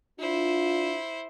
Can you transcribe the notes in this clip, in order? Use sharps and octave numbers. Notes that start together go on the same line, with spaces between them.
D4 E4 F4 C5